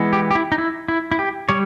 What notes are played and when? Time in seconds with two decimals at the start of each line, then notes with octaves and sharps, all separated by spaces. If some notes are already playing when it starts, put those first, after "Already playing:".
Already playing: E3 G#3 B3
0.13 G4
0.31 G4
0.35 E4
0.52 D#4
0.58 E4
0.88 E4
1.12 E4
1.19 G4
1.49 G3 C#5